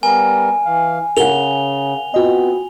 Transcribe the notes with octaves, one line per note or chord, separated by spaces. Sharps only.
G3 B3 A#4 G#5
E3 F5
C#3 A#4 F#5 F7 G7
B3 C4 F4 F#4 D#5